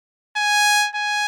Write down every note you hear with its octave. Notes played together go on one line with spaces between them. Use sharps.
G#5
G#5